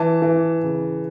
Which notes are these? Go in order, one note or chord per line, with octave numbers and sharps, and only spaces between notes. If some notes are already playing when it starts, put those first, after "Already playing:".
Already playing: E3 A5
E3
C#3